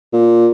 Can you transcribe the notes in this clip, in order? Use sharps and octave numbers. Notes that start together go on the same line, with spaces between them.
A#2